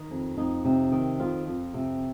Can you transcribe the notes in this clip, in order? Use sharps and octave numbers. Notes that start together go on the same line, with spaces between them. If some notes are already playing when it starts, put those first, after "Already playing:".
Already playing: D#3
F2
F2 D#4
C3
D#3
F2 F4
F2
C3